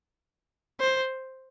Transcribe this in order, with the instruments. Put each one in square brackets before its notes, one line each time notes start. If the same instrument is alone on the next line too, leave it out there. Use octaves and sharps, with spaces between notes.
[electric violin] C5